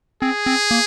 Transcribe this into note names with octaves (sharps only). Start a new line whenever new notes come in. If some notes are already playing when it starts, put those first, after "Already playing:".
C4 G#4
C4
A#3